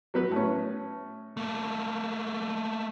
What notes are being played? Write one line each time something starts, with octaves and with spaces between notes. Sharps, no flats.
F#3 B3 B4
A2 C#4
A3 A#3